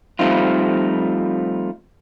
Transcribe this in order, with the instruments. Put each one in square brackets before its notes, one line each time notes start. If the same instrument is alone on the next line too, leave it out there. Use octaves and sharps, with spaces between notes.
[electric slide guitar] F3 G3 A3 C4 D#4 F4